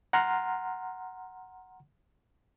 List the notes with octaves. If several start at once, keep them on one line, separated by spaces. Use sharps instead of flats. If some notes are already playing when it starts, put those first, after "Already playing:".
F#5 A#5 C6 F6